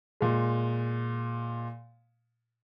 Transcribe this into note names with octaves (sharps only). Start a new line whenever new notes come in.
A#2 G#3